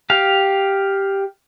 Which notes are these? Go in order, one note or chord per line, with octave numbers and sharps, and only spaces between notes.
G4 F5